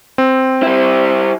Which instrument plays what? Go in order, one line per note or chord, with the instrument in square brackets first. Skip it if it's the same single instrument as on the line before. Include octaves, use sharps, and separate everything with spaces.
[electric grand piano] C4
[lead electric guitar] G3 E4